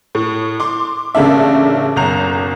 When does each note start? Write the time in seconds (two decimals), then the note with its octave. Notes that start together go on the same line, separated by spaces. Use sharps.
0.15 A2
0.60 C6 D6
1.15 A1 C#3 A3 A#3 D4 E5
1.96 F#1 B1 A#5 F7